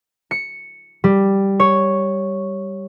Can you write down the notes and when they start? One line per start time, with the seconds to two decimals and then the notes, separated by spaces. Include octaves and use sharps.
0.31 C#7
1.04 G3
1.60 C#5